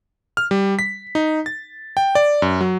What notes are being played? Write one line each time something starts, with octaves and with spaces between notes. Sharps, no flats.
F6
G3
B6
D#4
A6
G5
D5
F#2
F#3